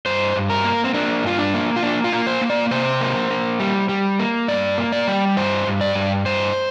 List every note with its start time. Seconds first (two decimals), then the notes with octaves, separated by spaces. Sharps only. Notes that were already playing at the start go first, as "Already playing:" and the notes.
0.06 G2 C5
0.36 G2
0.50 A#4
0.64 A#3
0.84 C4
0.94 A#3 D4
1.23 G2 F4
1.39 D4
1.54 A#3
1.76 F4
1.83 A#3 D4
2.04 F4
2.12 A#3
2.27 C5
2.41 A#3
2.50 D5
2.71 C3 C5
3.01 A#3
3.30 A#3
3.60 G3
3.89 G3
4.19 A#3
4.48 G2 D5
4.78 A#3
4.92 D5
5.08 G3
5.37 G2 C5
5.67 G2
5.81 D5
5.95 G2
6.26 G2 C5